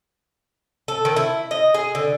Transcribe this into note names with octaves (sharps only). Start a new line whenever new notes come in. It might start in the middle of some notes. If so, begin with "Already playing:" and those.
A4
D#3
E4
D#5
G#4
D3